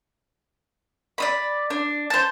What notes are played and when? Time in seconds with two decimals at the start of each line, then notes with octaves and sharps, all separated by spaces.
1.18 D5 D#5 B5
1.70 D4
2.10 C5 A5